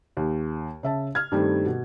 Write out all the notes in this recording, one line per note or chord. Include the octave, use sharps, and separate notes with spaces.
D#2
C#3 E5 A5
F6 G#6
G2 D#3 G3 A3 C4
B2